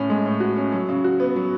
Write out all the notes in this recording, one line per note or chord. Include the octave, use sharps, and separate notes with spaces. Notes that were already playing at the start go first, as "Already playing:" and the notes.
Already playing: A2 C#4
G#3
A2
F#4
C#4
F#3
C#3
F#4
B3
F#3